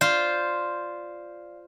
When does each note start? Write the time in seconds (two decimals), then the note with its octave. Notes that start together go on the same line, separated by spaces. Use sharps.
0.01 F4 C5 D5 F5 C7